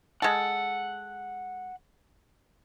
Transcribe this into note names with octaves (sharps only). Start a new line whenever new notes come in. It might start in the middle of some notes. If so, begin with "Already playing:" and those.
G#3 A4 F#5